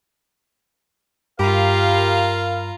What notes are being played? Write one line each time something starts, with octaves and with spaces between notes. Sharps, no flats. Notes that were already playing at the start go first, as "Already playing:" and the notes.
G2 F4 G4 A#4 F5 A#5 B5